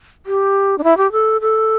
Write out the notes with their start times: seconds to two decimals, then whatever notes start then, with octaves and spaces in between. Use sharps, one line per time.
0.26 G4
0.78 D4
0.84 E4
0.97 G4
1.12 A4
1.41 A4